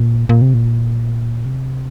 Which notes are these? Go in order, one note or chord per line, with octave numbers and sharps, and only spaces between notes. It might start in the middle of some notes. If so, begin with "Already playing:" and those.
Already playing: A#2
A#2
C3
A#2
C3